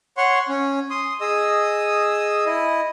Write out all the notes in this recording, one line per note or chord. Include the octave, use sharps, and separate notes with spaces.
C#5 F#5 C6 C#6
C#4
C6 D#6
G#4 D#5 D#6 E6
E4 D#5